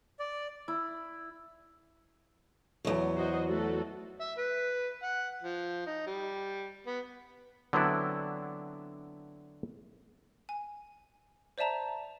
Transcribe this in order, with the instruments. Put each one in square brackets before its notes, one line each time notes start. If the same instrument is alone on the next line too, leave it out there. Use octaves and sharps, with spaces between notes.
[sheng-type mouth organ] D5
[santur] E4
[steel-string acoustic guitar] E2 F#3
[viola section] F#4 C5 D#5
A3 F#4 A4
[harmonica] E5
B4
F#5
F3
D#4
G3
B3
[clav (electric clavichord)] D3 F#3 B3 C4 D4 E4
[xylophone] G#5
C5 D5 E5 A5 A#5